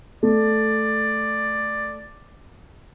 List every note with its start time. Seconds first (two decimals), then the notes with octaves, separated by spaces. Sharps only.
0.23 A3 D5